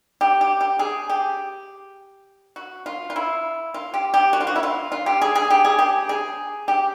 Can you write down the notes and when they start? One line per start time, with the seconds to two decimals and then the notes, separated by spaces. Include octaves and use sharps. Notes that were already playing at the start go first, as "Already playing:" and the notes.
0.21 G4
0.41 G4
0.61 G4
0.79 G#4
1.09 G4
2.56 F#4
2.86 F4
3.10 F4
3.16 E4
3.74 F4
3.94 G4
4.14 G4
4.33 F#4
4.41 F4
4.47 F#4
4.56 E4
4.63 F4
4.92 F4
5.06 G4
5.22 G#4
5.35 G#4
5.50 G4
5.65 G#4
5.79 G4
6.09 G#4
6.68 G4